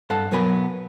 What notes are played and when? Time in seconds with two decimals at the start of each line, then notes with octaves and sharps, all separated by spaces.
0.10 G2 A4 F5 F#5 A5
0.31 B1 F#3 B3 A#4 G#5 B5